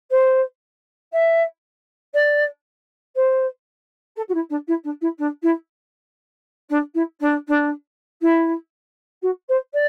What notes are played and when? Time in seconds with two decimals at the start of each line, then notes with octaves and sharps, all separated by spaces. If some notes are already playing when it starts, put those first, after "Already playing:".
0.11 C5
1.12 E5
2.14 D5
3.16 C5
4.16 A4
4.29 F#4
4.34 E4
4.49 D4
4.67 E4
4.84 D4
5.01 E4
5.18 D4
5.42 E4
6.69 D4
6.94 E4
7.20 D4
7.47 D4
8.21 E4
9.22 F#4
9.49 C5
9.73 D5